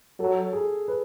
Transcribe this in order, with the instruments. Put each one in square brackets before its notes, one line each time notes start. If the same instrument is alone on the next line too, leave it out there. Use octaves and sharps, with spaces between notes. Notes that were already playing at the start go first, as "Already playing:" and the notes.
[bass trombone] F#3 [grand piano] A4
[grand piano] G#4
B4